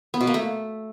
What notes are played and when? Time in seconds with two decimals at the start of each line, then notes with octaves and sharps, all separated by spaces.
0.14 B3
0.21 B2
0.27 A#3
0.34 A3